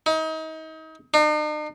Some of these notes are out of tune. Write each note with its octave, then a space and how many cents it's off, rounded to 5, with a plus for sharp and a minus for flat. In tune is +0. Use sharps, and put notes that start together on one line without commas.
D#4 +35
D#4 -45